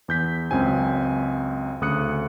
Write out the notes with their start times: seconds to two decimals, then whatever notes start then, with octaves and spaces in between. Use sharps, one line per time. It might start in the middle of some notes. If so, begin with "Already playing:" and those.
0.08 E2 G6 B6
0.51 C#2 F#2 C4 G#5
1.81 D2 C#3 D#6 F#6 C#7